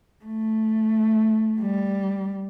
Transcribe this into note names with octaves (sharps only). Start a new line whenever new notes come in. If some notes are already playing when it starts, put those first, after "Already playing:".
A3
G3